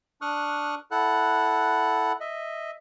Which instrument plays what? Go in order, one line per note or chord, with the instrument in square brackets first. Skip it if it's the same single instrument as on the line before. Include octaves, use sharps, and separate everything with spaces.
[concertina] D4 C#6 D#6 F6 F#6
E4 A4 F#5 F#6
D#5 E5